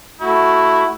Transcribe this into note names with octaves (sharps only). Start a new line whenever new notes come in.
A3 E4 F#4